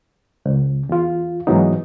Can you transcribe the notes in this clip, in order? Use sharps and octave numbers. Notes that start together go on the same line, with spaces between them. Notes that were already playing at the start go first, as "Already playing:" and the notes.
C#2
E2 F4
G#2 E3 F#3 B3 D#4